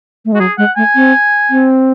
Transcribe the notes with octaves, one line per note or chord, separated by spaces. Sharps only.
A3
G#3
F#4
F#3 G#4
G#3 F#5
A3 G#5
C4
C4